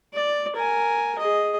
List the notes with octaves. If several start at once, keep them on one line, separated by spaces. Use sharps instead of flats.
D5
A#4 G#5
G#4 D#5